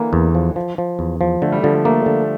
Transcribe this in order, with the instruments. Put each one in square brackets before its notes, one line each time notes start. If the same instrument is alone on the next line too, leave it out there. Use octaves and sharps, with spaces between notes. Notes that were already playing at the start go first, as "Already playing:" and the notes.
Already playing: [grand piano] D3 E3 [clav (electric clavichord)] A#3
[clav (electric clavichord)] E2
F3
F3
F3
E2
F3
[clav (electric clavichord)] D3 [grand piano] A3
[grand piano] G3
[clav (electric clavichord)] D3 [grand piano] F3
[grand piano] G3
[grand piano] A3 [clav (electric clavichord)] A#3
[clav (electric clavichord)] D3